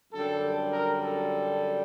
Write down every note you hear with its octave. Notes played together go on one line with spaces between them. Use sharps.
F#2 D3 G3 A4
A#4
A4